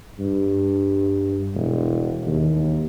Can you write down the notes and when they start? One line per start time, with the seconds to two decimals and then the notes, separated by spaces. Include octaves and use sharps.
0.19 G2
1.55 E1
2.27 D#2